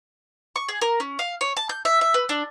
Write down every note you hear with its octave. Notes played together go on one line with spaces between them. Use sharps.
C#6
G#4
A#4
C#4
F5
C#5
A5
G6
E5
E5
B4
D4